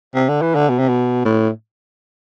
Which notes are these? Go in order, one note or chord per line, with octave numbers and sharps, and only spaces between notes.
C3
D3
E3
D3
B2
C3
B2
A2